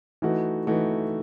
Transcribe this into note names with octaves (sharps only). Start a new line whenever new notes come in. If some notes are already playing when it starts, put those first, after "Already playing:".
E3 A3 D#4 F#4
E3 A3 D#4 F#4